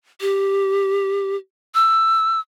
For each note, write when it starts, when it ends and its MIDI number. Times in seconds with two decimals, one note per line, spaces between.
0.21 1.36 67
1.75 2.40 88